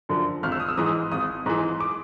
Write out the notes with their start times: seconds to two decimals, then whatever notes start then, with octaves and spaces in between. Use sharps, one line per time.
0.09 F#2 D3 F3
0.43 G#1 F6
0.52 E6
0.60 D#6
0.68 E6
0.77 G#2 E3 D#6
1.12 G#1 D#6
1.46 G#2 E3
1.80 D6